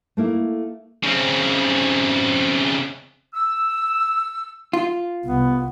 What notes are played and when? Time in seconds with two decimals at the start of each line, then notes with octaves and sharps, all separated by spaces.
0.17 A3 A#3 E4
1.04 C#3 C4
3.34 E6
4.73 F4
5.25 C2 B3